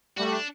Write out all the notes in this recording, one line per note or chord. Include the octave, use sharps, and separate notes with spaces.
G3 A3 F#4
D4